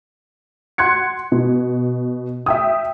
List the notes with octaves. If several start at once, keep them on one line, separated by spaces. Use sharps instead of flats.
F#5 C6 F#6 G#6 C#7
B2
E5 G5 D#6